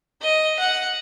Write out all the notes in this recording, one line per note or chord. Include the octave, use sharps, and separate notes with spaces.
D#5
F#5